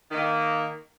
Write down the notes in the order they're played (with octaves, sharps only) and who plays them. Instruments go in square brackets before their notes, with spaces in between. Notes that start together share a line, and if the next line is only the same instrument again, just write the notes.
[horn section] D#3 A#3